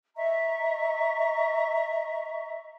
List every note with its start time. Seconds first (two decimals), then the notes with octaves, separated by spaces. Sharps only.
0.15 D#5 E5 A#5 C#6